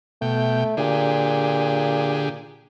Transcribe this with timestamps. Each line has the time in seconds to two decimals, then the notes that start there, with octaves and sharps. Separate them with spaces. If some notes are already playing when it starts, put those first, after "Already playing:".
0.22 B2 A3 G5
0.77 A#2 D3 G4 G#4